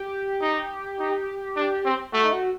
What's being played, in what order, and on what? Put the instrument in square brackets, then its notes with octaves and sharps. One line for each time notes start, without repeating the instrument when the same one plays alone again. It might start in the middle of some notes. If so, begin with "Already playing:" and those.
Already playing: [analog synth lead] G4
[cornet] D#4
D#4
D4
C4
[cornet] A3 [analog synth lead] F#4
[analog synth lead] D#4
F#4